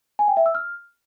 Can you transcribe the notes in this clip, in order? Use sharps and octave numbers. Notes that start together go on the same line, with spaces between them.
G#5
G5
E5
E6
F6